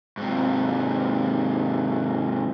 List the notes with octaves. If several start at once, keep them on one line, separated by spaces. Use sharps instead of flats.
G#2 C3